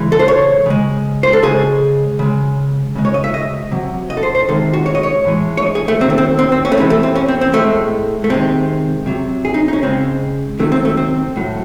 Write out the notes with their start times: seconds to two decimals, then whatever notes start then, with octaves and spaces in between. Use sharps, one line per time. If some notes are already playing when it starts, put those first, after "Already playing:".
Already playing: C#3 E3 G#3
0.12 A4
0.19 C5
0.28 C#5
0.66 C#3 G#3
1.23 C5
1.33 A4
1.43 C#3 G#3 G#4
2.19 C#3 G#3
2.95 C#3 G#3
3.05 C#5
3.14 D#5
3.24 E5
3.34 D#5
3.71 C3 F#3
4.10 D#5
4.17 A4
4.23 C5
4.35 C5
4.48 C3 D#3 G#3 A4
4.73 F#4
4.86 C#5
4.95 D#5
5.03 C#5
5.24 A2 E3 G#3
5.57 C#5
5.62 D#5
5.75 G#4
5.88 A3
6.00 C3 D#3 F#3 C4
6.10 A3
6.18 C4
6.39 C4
6.52 C4
6.65 C#4
6.72 A3
6.77 C3 E3 G#3 C4
6.90 A3
7.03 C4
7.15 C#4
7.28 C4
7.41 C4
7.53 A2 G#3 A3
8.24 A3
8.30 C3 D#3 G#3 C4
9.06 C3 F#3
9.45 G#4
9.54 D#4
9.68 D#4
9.73 C#4
9.83 C#3 G#3 C4
10.59 C3 D#3 F#3 A3
10.72 C4
10.85 A3
10.97 C4
11.36 A2 F#3